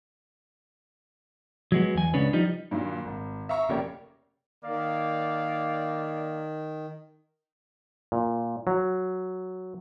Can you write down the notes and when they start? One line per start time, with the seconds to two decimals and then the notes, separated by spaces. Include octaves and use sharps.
1.72 F#3 G#3 B3
1.94 E2 G#5
2.14 C#2 C#3 B3 C#4 D4 B4
2.33 F3 G3 D#4
2.71 G2 A#2 D#3 F#3
3.05 G#1
3.49 E5 F5 A#5 C#6
3.69 F1 C#3 A#3 G4 C#5 D5
4.64 D#3 A#3 D5 F5
8.12 A#2
8.67 F#3